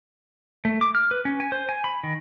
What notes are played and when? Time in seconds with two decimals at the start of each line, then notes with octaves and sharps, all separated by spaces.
0.65 A3
0.81 D6
0.95 F6
1.11 B4
1.25 C#4
1.40 G#5
1.52 C5
1.69 G#5
1.84 B5
2.03 D#3